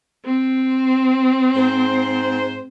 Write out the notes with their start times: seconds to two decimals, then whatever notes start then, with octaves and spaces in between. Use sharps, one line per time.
0.25 C4
1.57 G#2 C5